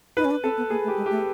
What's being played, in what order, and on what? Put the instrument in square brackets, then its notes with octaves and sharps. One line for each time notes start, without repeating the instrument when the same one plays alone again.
[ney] D#4 [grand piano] B4
[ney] C#4
D4
[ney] C4 [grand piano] A4
[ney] B3
[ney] A#3 [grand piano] G#4
[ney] A3
[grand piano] G4
[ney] G#3
[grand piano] G4
[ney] A3